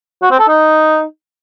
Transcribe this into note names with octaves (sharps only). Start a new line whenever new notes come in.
F#4
C4
A4
D#4